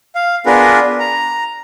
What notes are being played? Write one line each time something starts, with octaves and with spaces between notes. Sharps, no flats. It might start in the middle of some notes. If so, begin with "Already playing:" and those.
F5
B3 D4 F4 G#4 A#4 B4
A#5